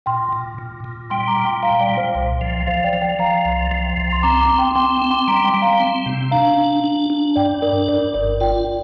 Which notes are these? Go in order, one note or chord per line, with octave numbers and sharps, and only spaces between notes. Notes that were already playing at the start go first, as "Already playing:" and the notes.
A#2 G5 C6
A#2
A#2
A#2
G3 G5 C6
A#5 D6
A#2
G5 C6
G3 F5 A#5
D5 G5
A#2
C5 F5
C2
F3
F3 C5 F5
D5 G5
F3
D5 G5
F3 F5 A#5
C2
F3
C2
C6
C4 A#5 D6
A#5 D6
C4
G5 C6
D6
C4 G5 C6
C4 D6
G5 C6
C6
G3 A#5 D6
G5 C6
G3
F5 A#5
C4
C3
D4 F5 A#5
D4
D4
D4
G2 D5 G5
D4 A#4 D5
G2 A#4 D5
G1 A#4 D5
F4 D5 G5